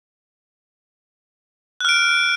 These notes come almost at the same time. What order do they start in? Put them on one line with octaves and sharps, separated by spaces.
F#6 F6 D7